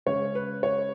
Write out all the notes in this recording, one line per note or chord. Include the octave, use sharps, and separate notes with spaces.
C#3 G#3 C#4 C#5
B4
C#5